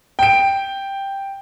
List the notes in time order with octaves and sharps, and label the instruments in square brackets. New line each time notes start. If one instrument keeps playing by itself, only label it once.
[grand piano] G5 D7